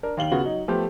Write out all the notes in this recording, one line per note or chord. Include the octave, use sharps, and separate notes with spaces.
D4 A#4
D#2 F5 F#7 G7
C#3 B3 F4 F#4
F#3 D#4
F3 A3 B3 G4